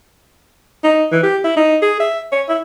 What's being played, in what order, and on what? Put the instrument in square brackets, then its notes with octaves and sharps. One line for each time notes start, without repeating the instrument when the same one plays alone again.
[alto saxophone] D#4
E3
G4
E4
D#4
G#4
E5
C#5
E4